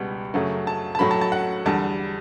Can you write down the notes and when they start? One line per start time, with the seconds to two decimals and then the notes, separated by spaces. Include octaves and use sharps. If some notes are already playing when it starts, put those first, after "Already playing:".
Already playing: C#2 B2 G3 B3
0.34 F#2 C#3 F#3 A3
0.67 A5
0.95 A5
0.99 A2 F#3 A3 B5
1.11 A5
1.21 A5
1.32 F#5
1.65 E2 D3 G3 A5